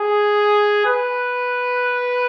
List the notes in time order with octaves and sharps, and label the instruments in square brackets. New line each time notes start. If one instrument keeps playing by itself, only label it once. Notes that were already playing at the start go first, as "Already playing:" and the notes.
Already playing: [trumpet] G#4
B4